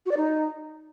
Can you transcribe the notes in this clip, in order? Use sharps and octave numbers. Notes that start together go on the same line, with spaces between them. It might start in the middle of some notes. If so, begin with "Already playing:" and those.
F#4
D5
D#4